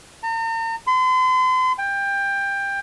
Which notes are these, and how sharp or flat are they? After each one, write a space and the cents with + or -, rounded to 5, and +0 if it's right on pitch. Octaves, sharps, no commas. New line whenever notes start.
A#5 -45
C6 -40
G5 +20